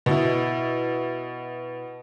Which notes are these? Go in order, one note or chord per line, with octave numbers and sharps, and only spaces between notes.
B2 E4